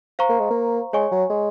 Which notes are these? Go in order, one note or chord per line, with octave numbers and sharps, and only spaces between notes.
C5 F5 A#5 C#6
A#3
G#3
A#3
G#3 C#5 G#5 C#6
F#3
G#3